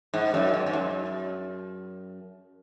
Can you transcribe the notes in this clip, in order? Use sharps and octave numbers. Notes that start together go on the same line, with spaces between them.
G#2
F#2
G#2
G#2
F#2